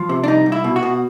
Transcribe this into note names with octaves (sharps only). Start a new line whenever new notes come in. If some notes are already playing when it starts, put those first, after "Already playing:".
Already playing: F3
C3
D4
C2 D#4
C2
E4
B2
F#4
B2